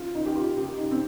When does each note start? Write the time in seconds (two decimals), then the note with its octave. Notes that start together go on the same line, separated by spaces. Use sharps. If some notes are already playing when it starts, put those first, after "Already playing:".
Already playing: F4
0.15 D#4
0.26 G4
0.35 F4
0.57 G4
0.78 D#4
0.91 C4